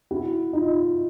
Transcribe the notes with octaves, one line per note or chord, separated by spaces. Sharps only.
E4 F#4
D#4 F4